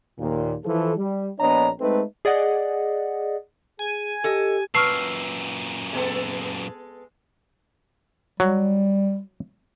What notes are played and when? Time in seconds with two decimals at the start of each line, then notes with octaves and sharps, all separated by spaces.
0.19 D#2 A#2
0.65 E3 F3 A4
0.97 G3
1.39 A#1 B3 D4 C#5 D#5 A#5
1.80 G#3 A3 C4 D#4 A4 B4
2.25 G#4 D5 D#5 F#5
3.79 G#4 G#5
4.24 G4 A4 D#5
4.75 F#2 A#2 B4 A5 C#6 E6 F6 C7
5.93 G#3 B3 A4
8.40 F#3 G3